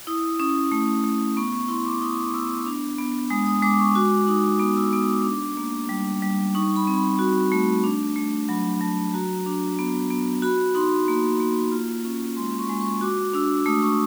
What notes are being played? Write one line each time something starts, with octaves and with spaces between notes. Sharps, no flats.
E4 D#6
C#4 D#6
A3
A3
B3 C#6
C#6
E4 C6
D6
E4 D#6
D6
B3 E6
D4
B3
G#3 D#6
D#6
G#3 D6
D6
C#6
F#4 D6
D#4 D#6
B3 D#6
E6
B3 D#6
D6
D4
A#3
G3
G3
D#4 C#6
B5
C4
B5
F#4
A3
D4
A3
F#3 B5
F#3 A5
F#4 A#5
D4
B3
B3
F#4 B5
D#4 C6
A#3
A#3
F4
C#4
G#3 C6
C#6
G#3
C#6
F#4 D6
D4 E6
A3 D#6
C#6